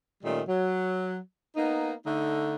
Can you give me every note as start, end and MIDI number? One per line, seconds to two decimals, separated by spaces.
0.23 0.41 46
0.23 0.41 51
0.23 0.41 55
0.23 0.41 57
0.23 0.41 61
0.48 1.17 54
1.56 1.93 58
1.56 1.93 59
1.56 1.93 63
2.06 2.55 50
2.06 2.55 57
2.06 2.55 63